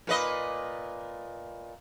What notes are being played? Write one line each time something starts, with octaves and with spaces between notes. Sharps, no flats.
A#2 B4 D#5